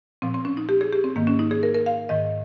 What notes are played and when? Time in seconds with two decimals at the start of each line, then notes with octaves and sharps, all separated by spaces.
0.22 A#2 F3 C4
0.34 C4
0.45 C#4
0.57 D#4
0.69 G4
0.81 G#4
0.93 G4
1.04 C4
1.16 G#2 D#3 A#3
1.27 C#4
1.39 D#4
1.51 G#4
1.63 A#4
1.74 A#4
1.86 F5
2.09 G#2 D#3 D#5